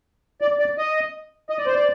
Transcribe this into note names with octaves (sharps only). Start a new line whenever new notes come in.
D5
D5
D#5
D#5
D5
C5
D5